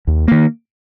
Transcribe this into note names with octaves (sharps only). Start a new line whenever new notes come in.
D#2
D#3 A#3